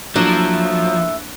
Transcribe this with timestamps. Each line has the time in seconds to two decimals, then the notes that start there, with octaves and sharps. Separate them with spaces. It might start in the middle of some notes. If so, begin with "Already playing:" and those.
0.16 F3 F#3 A3 A#3 D4 E4 F#6